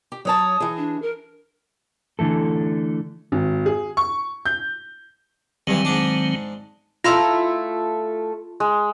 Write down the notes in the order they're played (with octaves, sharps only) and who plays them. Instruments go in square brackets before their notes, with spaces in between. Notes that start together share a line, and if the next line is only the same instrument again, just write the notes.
[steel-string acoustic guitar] G4
[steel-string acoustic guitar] F#3 C#5 A5 [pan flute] D#6
[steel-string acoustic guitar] E3 G#4
[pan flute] D4
A#4
[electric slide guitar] D3 E3 A3 A4
[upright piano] G#1
G#4
C#6
G6
[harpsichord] G2 E3 [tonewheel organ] D#3 F#3 C4
[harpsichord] G#2 D4
[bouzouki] A3 E4 F5 [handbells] F4 B5 C6
[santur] G#3